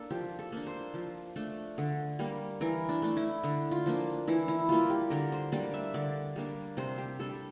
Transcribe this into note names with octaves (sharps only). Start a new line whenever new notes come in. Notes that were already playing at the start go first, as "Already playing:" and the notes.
Already playing: A#3 D4 A4
F3 G4
A4
A#3 D4
C5
F3
A3 D4
D3
G3 A#3
E3 A#4
D4
A3 D4
E4
D3
F4
F3 A#3 D4
E3 E4
E4
G3 A#3 F4
G4
D3 A#4
C5
G3 A#3 D4 D5
E5
D3 D5
G3 A#3 D4
C3 C5
G4
G3 D4 A4